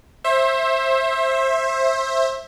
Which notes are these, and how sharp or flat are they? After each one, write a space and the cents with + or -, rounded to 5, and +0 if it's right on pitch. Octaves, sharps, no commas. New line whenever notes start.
C5 +30 E5 +0